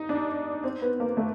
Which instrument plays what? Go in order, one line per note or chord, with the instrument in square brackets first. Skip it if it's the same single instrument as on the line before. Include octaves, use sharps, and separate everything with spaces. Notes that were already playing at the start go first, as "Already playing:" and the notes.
Already playing: [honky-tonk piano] D#4
D4
C4
B3
A#3
A3